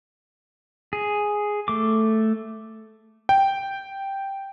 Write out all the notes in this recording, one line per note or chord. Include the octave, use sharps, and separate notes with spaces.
G#4
A3 D6
G5